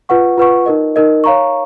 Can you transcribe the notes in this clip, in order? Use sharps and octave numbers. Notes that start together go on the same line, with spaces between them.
F4 B4 F#5 C#6
F4 B4 F#5 C#6
D#4 A#4 D#5
D#4 A#4 D#5
C#5 F5 A#5 C#6